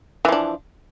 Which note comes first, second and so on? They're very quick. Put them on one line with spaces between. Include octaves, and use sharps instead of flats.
E3 F3 D4